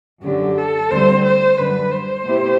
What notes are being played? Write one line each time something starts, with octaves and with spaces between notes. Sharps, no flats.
F#2 D3 F#3 G4
A4
D2 D3 G3 C4 C5
C5
F#2 D3 G3 B4
C5
B2 A3 C4 E4 G4